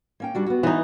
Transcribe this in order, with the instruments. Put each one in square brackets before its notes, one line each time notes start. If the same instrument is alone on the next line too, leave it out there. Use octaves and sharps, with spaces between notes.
[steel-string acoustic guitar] A#3 C#4 G5
G3 D4 F#4
B3 F#4
[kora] E3 D#4